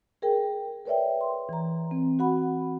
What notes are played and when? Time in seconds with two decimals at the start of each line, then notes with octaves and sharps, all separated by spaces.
0.22 G#4 A#4 G5
0.86 A#4 B4 C#5 D5 E5 G5
1.21 C6
1.49 E3 A#5
1.91 C4
2.19 F#4 F#5 B5